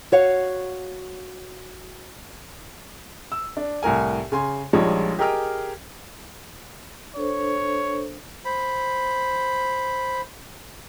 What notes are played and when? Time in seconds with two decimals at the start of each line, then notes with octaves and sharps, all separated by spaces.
0.12 F#4 C#5 F5
3.32 E6
3.57 D4
3.83 C2 A2 A#4 G#5
4.32 C#3 G#5 C6
4.73 A#1 F3 G3 G#3 D#4 C#5
5.19 G4 G#4 A#4 D#5 G5 F6
7.16 D4 A4 C5 C#5
8.45 C5 B5